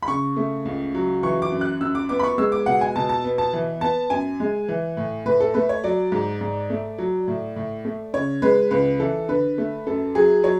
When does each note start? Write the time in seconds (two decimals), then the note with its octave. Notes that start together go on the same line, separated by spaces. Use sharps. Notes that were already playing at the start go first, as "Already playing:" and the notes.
0.02 B5
0.08 C#3 C#6
0.37 A3
0.65 C#2
0.95 F#3
1.23 E3 C#6
1.42 D6
1.52 F#2
1.61 F#6
1.81 F#2 E6
1.95 D6
2.09 B3 D6
2.19 B5
2.23 C#6
2.38 G#3 E6
2.52 D6
2.66 B2 F#5
2.81 G#5
2.96 B2 A5
3.09 A5
3.24 B3
3.38 A5
3.53 E3
3.81 B3 A5
4.10 F#2 G#5
4.40 G#3
4.68 E3
4.97 A2
5.25 A2 B4
5.40 A4
5.54 A3 B4
5.69 C#5
5.84 F#3 D5
6.12 G#2
6.41 G#2
6.70 A3
6.98 F#3
7.28 A2
7.56 A2
7.85 A3
8.13 C#3 C#5
8.42 G#3 B4
8.71 C#2 B4
9.00 E3 A4
9.29 D3 B4
9.58 A3
9.86 F#2 A4
10.15 F#3 G#4
10.43 F#3 C#5